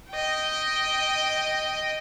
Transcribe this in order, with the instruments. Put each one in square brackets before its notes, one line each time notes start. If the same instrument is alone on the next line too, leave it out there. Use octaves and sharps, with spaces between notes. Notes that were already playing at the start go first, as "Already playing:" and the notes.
[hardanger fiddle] D#5 G5